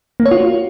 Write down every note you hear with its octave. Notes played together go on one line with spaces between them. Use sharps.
A#3
C#5
F4
F#4